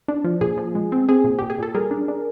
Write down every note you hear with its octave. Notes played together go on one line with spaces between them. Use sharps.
D4
F3
A#2 G#4
F3
G#3
C4
C4 G#4
A#2
A#2 G4
G#4
A#2 A4
G3 G#4 A#4
D4
D4